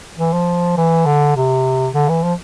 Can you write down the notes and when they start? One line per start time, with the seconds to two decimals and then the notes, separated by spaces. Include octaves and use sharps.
0.19 E3
0.33 F3
0.77 E3
1.06 D3
1.36 C3
1.94 D3
2.08 E3
2.23 F3